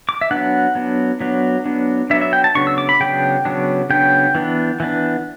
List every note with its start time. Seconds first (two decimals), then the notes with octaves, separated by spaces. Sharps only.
0.09 D6
0.21 E5
0.31 F#3 B3 D4 F#5
0.75 F#3 B3 D4
1.20 F#3 B3 D4
1.66 F#3 B3 D4
2.10 F#3 B3 D4 E5
2.21 E5
2.33 G5
2.44 A5
2.55 C#3 F#3 B3 D4 C#6
2.67 E6
2.78 D6
2.89 B5
3.00 C#3 F#3 B3 D4 G5
3.45 C#3 F#3 B3 D4
3.90 C#3 F#3 B3 D4 G5
4.35 E3 B3 D4
4.80 E3 B3 D4